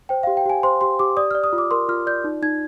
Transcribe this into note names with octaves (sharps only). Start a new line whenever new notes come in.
C5 G5
G4 F5
G5
G4 G#5
C5 C6
G4 C6
G4 D6
D5 D#6
D5 F6
D#6
F4
D6
A#4 C6
F4 F6
D5 G6
D#4
D#4 G#6